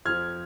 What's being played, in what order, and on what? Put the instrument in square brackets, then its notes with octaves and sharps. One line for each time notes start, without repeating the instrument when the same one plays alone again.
[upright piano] F2 F3 F6 G#6